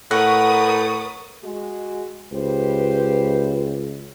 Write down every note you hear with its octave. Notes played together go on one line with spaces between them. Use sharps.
A2 A#4 B4 F#5 C#6 D#6
G#3 F#4
C#2 G4 B4 C5